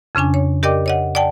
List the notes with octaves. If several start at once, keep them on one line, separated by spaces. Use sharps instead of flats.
F2 C#3 C#4 D4 G#5
C#5
G4 A#4 D5 D#5 G5 D6
C#5 D#5 F#5
D5 F#5 G5 A5